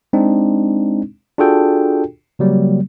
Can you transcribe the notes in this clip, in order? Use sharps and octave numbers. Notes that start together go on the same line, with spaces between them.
G#3 C4 D4 D#4
D4 F4 F#4 G#4 A4 G5
C#3 F#3 G3 A#3